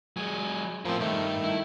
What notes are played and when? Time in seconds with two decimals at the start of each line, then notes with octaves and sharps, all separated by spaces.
0.17 F#3 G#3 G#5
0.85 A2 F3 C4 A#4
1.00 G2 D#3 A3
1.44 E4